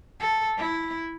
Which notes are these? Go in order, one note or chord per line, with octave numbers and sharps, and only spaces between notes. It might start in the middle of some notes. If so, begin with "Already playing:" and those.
A4
E4